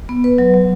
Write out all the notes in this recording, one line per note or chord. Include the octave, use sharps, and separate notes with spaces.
B3
B4
F#3
F#3